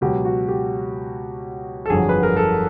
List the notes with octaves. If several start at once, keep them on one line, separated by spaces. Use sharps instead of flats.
C#2 B2 F#3 G4
F#4
G4
A4
G1 F2 D3 F#3 G#4
B4
A#4
A4